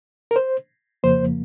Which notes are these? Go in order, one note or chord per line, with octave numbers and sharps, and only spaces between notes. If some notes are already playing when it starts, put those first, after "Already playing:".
A#4
C5
F2 C#3 F3 A#3 C5